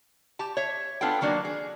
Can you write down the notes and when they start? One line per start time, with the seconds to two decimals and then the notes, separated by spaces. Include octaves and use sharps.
0.39 G4 A5
0.57 C#5 E5
1.01 B3 D4 F4 A4 G5
1.21 D#3 F#3 A#3 D4
1.45 G#4